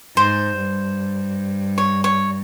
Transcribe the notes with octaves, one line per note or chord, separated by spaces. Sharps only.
G#2 C5
G2
C#5
C#5